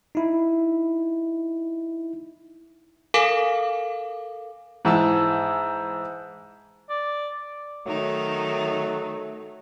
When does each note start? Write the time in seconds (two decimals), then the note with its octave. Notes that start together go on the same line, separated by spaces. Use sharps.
0.15 D#4 E4
3.14 A4 A#4 F5 G#5 D6
4.85 G#2 E3 A5 E6
6.90 D5
7.86 D#3 F#3 A3 D#4